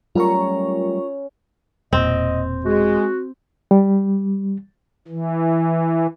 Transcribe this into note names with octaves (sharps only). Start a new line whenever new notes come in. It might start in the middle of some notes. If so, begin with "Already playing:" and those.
F#3 G3 A3 C#4 F4 A#4 A#5 C#6
E1 A#2 C4 D#5
G#3 F#4
G3
E3